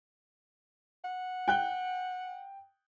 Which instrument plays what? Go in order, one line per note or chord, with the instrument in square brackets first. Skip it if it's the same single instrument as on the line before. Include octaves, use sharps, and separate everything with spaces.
[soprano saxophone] F#5
[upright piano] G5 F#6 G7